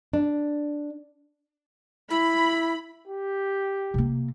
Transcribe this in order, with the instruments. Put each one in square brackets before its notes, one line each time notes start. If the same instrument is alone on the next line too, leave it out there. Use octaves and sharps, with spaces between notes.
[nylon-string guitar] D4
[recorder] E4 [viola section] B5
[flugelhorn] G4
[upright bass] C3 A#3